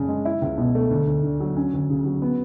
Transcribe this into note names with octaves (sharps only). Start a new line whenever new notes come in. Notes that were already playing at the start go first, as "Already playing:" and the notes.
Already playing: F#2 C#3 D4
G#3
E4
C#2
B2
A3
D2
D2
D3
F#3
C#4
D2
C#3
F#3
B3